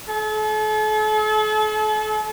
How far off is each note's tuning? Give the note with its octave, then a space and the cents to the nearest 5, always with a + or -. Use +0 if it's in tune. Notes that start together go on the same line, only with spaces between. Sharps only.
A4 -40